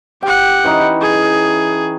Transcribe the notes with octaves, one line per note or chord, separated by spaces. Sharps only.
G4 F#5 G5
E3 C#4 D#4
G#4